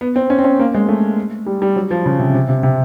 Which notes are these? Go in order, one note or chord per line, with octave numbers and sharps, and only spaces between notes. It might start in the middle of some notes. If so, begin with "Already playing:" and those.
B3
C4
C#4
C4
C#4
A#3
G#3
A3
G3
G3
F#3
F3
C#3
C3
C3
C3
C3